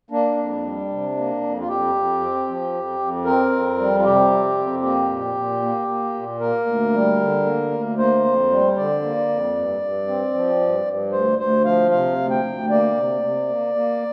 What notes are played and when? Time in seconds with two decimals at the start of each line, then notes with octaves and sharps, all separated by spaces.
0.10 A#3 D4
0.37 F2
0.63 G3
0.90 C3
1.16 A#3
1.41 F2
1.60 F4
1.68 F2 G4
1.95 F2
2.21 C4
2.48 F3
2.73 F2
2.99 F2
3.25 C4 A#4
3.52 F2
3.78 G3
3.98 F4
4.04 C3 G4
4.31 C4
4.57 F2
4.83 A#3 G4
5.09 A#2
5.35 A#2
5.62 A#3
5.88 A#3
6.14 A#2
6.40 A#3 A#4
6.67 D2
6.93 G3
7.19 D3
7.46 A#3
7.71 D2
7.98 A#3 C5
8.24 F2
8.51 G3
8.76 D3 D5
9.02 A#3
9.29 F2
9.55 G2
9.82 G2
10.08 C4
10.34 F3
10.61 G2
10.86 G2
11.12 D2 C5
11.38 D2 C5
11.65 F3 F5
11.91 C3 F5
12.17 D2
12.30 G5
12.43 D2
12.70 A#3 D5
12.96 C3
13.22 C3
13.49 A#3
13.75 A#3